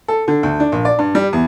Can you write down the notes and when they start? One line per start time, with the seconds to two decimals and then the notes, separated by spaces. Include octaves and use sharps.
0.08 A4
0.28 D3
0.43 D2
0.60 D4
0.72 A#1
0.85 D5
0.99 G2
1.15 G3
1.33 E2